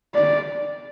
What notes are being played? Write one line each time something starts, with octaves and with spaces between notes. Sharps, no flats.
D5